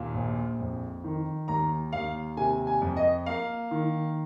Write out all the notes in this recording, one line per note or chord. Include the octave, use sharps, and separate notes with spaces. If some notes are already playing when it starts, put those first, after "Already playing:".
Already playing: D#2 A#2
A#1
F2
D#3
D#2 A#5
D#2 F5
C3 G#5
G#5
F2
D#5
A#3 F5
D#3